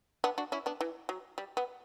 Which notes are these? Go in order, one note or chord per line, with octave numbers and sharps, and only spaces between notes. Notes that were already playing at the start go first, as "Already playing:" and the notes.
B3 D4
D4 F#4
C#4 E4
B3 D4
E3
F#3
G3
B3